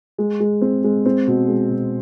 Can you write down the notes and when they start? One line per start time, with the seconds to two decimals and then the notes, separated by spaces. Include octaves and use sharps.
0.18 G#3
0.40 G#3
0.62 C4
0.84 G#3
1.06 C4
1.27 B2
1.48 G#3
1.70 B2